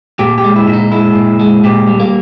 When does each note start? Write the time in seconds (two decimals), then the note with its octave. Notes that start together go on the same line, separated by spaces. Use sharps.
0.19 A#2 G4
0.38 G4
0.44 G#3
0.56 E4
0.68 A#2
0.74 D#4
0.92 G#3 E4
1.15 A#2
1.39 G#3
1.64 A#2 G4
1.88 G3
2.00 A#3